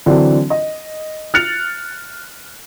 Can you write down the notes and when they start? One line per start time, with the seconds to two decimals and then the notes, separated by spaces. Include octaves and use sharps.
0.06 D3 E3 F#3 C4 D4
0.50 D#5
1.34 F6 F#6 A6 C#7 F7